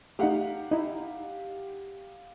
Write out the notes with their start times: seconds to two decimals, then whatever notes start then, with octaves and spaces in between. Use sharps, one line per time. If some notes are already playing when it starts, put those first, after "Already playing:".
0.19 A3 D#4 G4 F5 F#5
0.71 D#4 E4